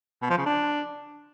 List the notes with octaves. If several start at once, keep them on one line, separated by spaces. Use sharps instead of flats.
B2
F3
C#3
D4